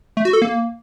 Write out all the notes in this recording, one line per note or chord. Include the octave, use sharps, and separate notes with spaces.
A3
F#4
A4
A#3